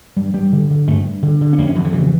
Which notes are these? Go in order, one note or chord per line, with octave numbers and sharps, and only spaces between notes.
G2 G3
G2 G3
D3
D3
G2 A3
G2
D3
D3
C#4
F2 A#3
C#4
F2 E3
D3
C#3 E3